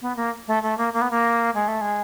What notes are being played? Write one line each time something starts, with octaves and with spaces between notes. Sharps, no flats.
B3
A#3
A3
A3
A#3
A#3
B3
A#3
G#3
A3
G#3